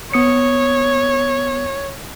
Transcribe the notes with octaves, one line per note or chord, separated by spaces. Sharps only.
B3 C#5 D#6 C#7